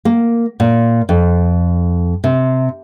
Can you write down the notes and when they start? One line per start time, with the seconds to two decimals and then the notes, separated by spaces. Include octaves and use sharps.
0.05 A#3
0.60 A#2
1.09 F2
2.24 C3